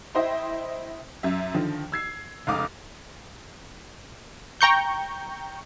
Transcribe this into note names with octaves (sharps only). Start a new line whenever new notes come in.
E4 C5 D#5 G5 C6
F#2 E5
D3 D#3 F3
E6 G#6 C7
F1 C#2 F5 D6 D#6
G5 A#5 C#6 G6